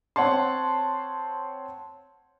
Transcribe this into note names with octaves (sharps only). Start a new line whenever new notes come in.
C4 C#5 F#5 A5 C6